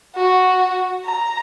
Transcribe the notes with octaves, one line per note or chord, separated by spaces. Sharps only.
F#4
A#5